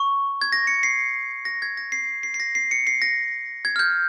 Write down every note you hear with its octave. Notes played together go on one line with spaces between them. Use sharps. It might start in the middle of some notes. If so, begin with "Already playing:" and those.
Already playing: C#6
G#6
A#6
C#7
C7
A#6
G#6
A#6
C7
C7
C7
A#6
C7
C#7
C7
A#6
G#6
F6
G6